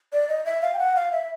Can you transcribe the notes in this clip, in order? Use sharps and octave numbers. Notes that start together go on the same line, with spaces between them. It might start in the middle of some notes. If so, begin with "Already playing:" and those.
D5
D#5
E5
F5
G5
F#5
F5
E5